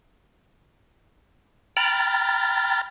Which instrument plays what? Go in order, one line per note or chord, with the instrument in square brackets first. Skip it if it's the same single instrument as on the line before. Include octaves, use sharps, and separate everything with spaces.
[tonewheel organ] G5 A#5 B5 F6 A6